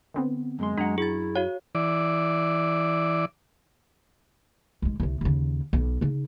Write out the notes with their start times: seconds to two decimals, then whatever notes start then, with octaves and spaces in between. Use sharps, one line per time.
0.14 D3 B3 C4
0.59 F#2 G#3 C6
0.78 F#2 F#3 D4 F#5 A#5
0.98 E4 G#4 A6
1.35 F#4 C#5 F5
1.75 E3 D5
4.82 B1 G#3
5.00 C2 C3
5.21 D#2 C#3
5.73 B1
6.01 C#3 D#4